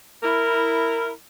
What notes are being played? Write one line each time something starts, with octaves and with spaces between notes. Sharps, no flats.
E4 A#4